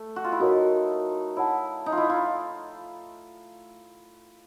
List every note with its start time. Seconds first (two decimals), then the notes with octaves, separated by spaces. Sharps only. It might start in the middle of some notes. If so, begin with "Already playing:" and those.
Already playing: A3
0.16 F#4
0.24 F4
0.32 E4
0.40 D#4 F#4 A#4 C#5
1.37 E4 C#5 F#5 A5
1.86 D#4
1.92 F4
1.97 E4
2.10 F4